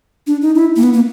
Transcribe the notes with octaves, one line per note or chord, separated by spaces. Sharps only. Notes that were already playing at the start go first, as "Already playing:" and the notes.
D4
D#4
E4
A#3
B3
A#3